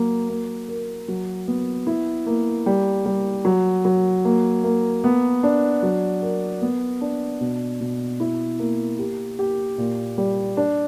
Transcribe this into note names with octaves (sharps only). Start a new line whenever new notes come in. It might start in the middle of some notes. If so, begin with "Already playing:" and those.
Already playing: F#3 A#3
A#3
A#4
F#3
B3
E4
A#3
G3
G3
F#3
F#3
A#3
A#3
B3
D4
F#3
A#4
B3
D4
B2
B2
E4
A#3
G4
G4
A#2
G3
D4